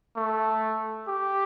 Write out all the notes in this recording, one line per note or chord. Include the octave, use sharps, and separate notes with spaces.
A3
G4